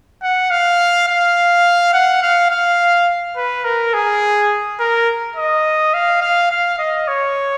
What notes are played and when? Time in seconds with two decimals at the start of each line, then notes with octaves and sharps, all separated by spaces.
0.23 F#5
0.51 F5
1.08 F5
1.94 F#5
2.22 F5
2.50 F5
3.36 B4
3.64 A#4
3.94 G#4
4.80 A#4
5.36 D#5
5.94 F5
6.22 F5
6.51 F5
6.79 D#5
7.08 C#5